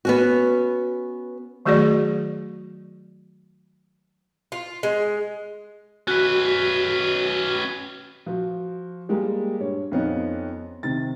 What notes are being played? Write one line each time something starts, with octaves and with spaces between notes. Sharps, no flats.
B3 C#4 F#4
D#3 F#3 A3 F#4 G#4 D5
F4
G#3
C#4 F#4 B4
F3 F#4
G3 G#3 A#3 G4
G2 C#5
F2 F3 B3 C#4 D#4
C3 D#3 A6